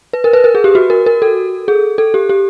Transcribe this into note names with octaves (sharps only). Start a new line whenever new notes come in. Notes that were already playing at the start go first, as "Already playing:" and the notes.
B4
A#4
B4
A#4
G#4
G4
F#4
A#4
A#4
A4
G#4
A4
G4
G4